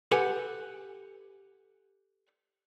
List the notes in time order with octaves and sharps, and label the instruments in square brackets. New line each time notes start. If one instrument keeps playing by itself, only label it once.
[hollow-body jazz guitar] G4 A4 B4 F#5 G#5